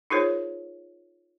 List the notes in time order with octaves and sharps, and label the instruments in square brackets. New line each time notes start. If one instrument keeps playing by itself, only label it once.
[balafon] D#4 F4 G#4 A#4 C5 C#5